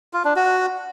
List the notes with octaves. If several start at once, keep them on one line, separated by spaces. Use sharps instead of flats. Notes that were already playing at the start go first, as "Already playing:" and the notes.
F4
D4
F#4